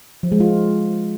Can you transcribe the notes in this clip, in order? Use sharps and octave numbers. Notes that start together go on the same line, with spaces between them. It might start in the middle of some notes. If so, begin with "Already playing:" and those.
F3
G#3
F4